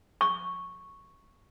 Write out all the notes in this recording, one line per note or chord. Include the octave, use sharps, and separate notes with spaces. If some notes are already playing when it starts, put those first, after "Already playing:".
C#6